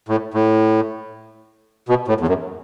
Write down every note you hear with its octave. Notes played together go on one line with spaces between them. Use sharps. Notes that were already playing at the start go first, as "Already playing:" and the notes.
A2
A2
B2
A2
E2
F#2